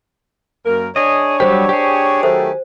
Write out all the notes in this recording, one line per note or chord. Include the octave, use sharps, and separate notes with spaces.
F#2 A#3 A#4
D4 G#4 C#5 D#5
F#3 G3 G4 C5
G4 G#4
D#3 F#3 A3 C5